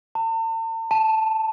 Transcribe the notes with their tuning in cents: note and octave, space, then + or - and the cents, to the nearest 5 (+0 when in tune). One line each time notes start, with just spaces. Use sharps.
A5 +45
A5 +0